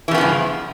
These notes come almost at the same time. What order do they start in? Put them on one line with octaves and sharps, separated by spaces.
E3 C#3 B3 F3 G2